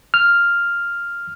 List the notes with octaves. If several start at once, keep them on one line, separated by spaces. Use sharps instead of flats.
F6